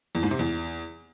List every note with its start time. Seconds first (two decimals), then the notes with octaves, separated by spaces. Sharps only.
0.15 E2
0.23 G#2
0.31 C3
0.39 E2